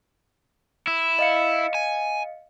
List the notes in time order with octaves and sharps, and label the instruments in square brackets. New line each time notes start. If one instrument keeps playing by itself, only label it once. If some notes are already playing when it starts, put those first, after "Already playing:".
[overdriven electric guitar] E4
[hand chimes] D#5 F5 C#7
[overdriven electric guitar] G#5